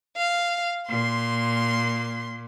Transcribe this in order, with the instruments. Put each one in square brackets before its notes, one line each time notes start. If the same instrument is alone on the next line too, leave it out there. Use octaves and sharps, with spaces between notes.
[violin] F5
[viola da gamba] A#2 [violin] C6